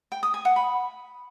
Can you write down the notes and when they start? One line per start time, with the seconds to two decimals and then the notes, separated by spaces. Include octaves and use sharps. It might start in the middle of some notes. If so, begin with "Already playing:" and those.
0.12 G5
0.23 D#6
0.34 G#5
0.45 F#5
0.56 B5